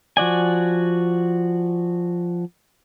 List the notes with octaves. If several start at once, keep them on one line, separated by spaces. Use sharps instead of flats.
F3 F#4 D5 G#5